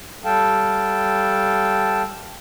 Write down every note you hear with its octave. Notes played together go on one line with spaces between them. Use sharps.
G3 A4 F5 G5 A5